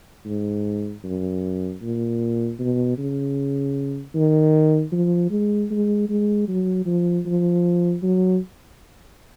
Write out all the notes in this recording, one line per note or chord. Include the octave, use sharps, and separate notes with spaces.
G#2
F#2
A#2
B2
C#3
D#3
F3
G#3
G#3
G#3
F#3
F3
F3
F#3